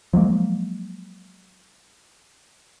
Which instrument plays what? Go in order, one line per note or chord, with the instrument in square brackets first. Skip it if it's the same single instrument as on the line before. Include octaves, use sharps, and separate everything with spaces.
[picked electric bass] F3 F#3 G#3 A#3